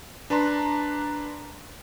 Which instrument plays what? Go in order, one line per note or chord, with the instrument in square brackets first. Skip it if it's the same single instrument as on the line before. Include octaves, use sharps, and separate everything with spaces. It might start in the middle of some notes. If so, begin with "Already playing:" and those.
[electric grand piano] D4 B4 A5 A#5 C6